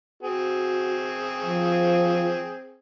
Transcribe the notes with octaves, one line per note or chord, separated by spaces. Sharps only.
C4 F#4 G#4
F3